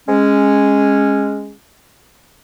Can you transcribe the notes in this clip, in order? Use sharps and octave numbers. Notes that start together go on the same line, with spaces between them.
G#3 C#4